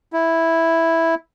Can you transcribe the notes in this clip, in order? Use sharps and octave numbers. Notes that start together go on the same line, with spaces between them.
E4